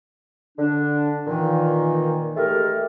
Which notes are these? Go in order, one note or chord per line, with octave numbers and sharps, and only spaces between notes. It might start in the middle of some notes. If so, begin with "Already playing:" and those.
D3 D4
A#2 D#3 E3
G#3 A3 G4 A4 A#4